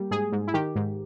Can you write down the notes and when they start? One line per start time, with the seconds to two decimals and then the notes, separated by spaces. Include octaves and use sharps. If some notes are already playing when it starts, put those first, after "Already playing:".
Already playing: G3 A#3
0.11 G#2 G#4
0.32 G#2
0.47 E4
0.54 D#3 G4
0.75 G#2